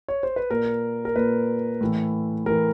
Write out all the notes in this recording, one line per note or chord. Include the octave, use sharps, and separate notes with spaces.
C#5
C5
B4
A#2 A#4
A#4
A#2 B4
A2 E3
A2 E3 A#4